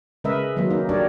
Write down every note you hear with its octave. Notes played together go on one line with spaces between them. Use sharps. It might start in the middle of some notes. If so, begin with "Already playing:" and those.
C#3 G#3 A#4 B4 D#5 E5
D#3 F#3 G#3 A#3 F4
A#3 D#4
G3 D4 G4 A#4 C#5 D5